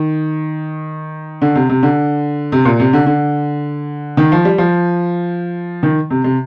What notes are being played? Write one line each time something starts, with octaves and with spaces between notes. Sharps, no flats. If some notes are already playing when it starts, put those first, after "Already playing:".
Already playing: D#3
D3
C3
C3
D3
C3
A#2
C3
D3
D3
D#3
F3
G3
F3
D#3
C3
C3